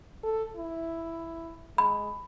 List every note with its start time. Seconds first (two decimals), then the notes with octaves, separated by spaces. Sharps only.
0.24 A4
0.56 E4
1.78 G#3 B5